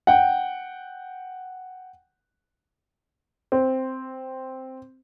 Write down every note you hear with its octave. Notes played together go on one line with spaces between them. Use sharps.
F#5 G5
C4